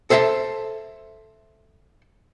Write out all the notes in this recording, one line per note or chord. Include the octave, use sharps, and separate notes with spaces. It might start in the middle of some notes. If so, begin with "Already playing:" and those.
A4 C5 E5 F#5 A5